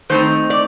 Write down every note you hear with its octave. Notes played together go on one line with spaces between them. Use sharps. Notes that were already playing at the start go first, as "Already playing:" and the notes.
D#3 A3 C4 D#4 C5
D5